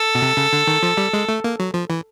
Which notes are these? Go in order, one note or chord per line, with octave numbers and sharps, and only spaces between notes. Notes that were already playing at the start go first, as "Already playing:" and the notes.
Already playing: A4
B2
C3
C#3
D3
D#3
F3
G3
G#3
A3
A#3
F#3
F3
E3